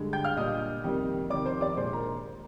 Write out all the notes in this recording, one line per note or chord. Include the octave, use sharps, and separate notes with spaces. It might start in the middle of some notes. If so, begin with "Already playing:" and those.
Already playing: G2 D3 G#3
G5 G6
F5 F6
A#2 G3 D4 D#5 D#6
F2 C3 D#3 G3 A#3
F2 C3 D#3 D5 D6
C5 C6
D5 D6
A#2 G#3 D4 C5 C6
A#4 A#5